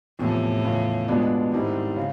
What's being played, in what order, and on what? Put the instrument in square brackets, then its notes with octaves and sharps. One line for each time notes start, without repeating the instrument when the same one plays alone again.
[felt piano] E2 C3 F3 [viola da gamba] A2
[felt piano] E2 C#3 F3
B2 G#3 B3 D4 F4
[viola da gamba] G#2 [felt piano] D#3 G3 C4 E4
[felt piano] C#3